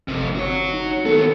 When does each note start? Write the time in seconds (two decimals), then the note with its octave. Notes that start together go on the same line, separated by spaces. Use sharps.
0.08 G1 F2 C3
0.36 F#4 C#5
0.74 D#4
1.05 D#2 B3 A4